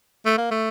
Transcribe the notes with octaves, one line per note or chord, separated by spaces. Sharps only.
A3
A#3
A3